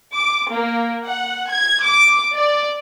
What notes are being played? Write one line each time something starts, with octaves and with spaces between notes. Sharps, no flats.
D6
A#3
F#5
G#6
D6
D5